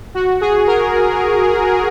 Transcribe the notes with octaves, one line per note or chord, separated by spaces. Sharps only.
F#4
G#4
A#4